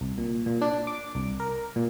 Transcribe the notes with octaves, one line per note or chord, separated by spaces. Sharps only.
C2
A#2
A#2
D4
D6
C2
A#4
A#2